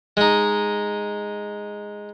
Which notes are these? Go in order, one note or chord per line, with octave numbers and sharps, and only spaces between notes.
G#3 D#4